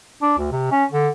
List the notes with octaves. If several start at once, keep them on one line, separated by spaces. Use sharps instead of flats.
D4
D2
C3
C#4
D3